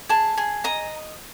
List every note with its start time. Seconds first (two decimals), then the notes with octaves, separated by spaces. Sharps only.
0.09 G#4 A5
0.37 G#4
0.64 D#5 A#5